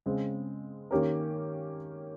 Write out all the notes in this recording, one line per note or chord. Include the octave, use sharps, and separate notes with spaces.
C#3 G#3 C4
D#3 A#3 C#4 G4 A#4